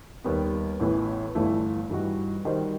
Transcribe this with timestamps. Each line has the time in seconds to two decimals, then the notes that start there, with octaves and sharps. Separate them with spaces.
0.24 D#2 D#3 G3 B3
0.80 A1 A2 E3 B3
1.35 G1 G2 E3 A3 E4
1.90 G2 E3 G3 D#4 F#4
2.45 D#3 G3 D#4 F#4 C5